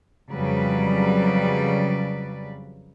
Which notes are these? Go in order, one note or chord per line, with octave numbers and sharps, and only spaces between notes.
F2 C#3 F#3 G3 B4 D5